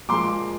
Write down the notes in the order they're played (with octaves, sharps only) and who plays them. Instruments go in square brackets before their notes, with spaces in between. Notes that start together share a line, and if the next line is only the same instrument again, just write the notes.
[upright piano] A#2 F3 G#3 C6 D6